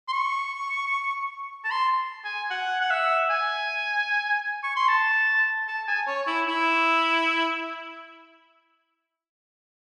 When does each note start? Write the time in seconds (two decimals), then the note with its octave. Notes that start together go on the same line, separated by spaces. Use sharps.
0.08 C6
0.13 C#6
1.64 A5
1.71 C6
2.24 G#5
2.50 F#5
2.81 F#5
2.90 E5
3.30 G#5
4.63 C#6
4.76 C6
4.88 A5
5.68 A5
5.88 G#5
6.07 C#5
6.27 E4
6.47 E4